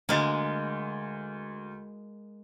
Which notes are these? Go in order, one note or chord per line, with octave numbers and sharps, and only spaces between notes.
D2 G#3 A#3 A6